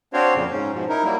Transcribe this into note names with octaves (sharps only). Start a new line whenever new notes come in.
C4 D4 F#4 C5 C#5 F5
F2 A#2 C#3
G#2 C#4
G#2 B2 F3
D#4 E4 A#4
F#3 G3 A#3 E4